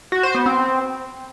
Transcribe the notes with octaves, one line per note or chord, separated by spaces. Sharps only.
F#4
C5
B3
C4